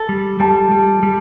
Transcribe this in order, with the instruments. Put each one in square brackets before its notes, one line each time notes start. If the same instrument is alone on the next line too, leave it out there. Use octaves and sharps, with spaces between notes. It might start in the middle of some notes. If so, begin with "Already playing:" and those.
Already playing: [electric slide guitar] A4
G3
[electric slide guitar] G3 [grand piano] A5
[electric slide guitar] G3
G3